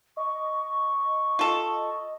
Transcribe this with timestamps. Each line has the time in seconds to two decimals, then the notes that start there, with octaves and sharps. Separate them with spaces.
0.17 D#5 C#6
1.39 F4 A4